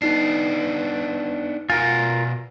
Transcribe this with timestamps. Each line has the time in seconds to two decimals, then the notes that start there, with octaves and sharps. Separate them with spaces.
0.02 B3 D4 D#4 C7
1.70 B2 F4 A#4 F#5 G#5